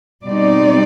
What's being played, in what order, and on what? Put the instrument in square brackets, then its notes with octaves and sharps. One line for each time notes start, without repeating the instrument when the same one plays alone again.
[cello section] B2 G3 C4 D#4 D5